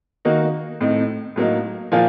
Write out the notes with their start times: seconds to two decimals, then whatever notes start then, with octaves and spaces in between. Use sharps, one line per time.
0.25 D#3 A#3 D#4 F#4
0.81 A2 A3 C4 D#4
1.36 A2 F#3 A#3 D#4
1.92 A#2 F3 A#3 F4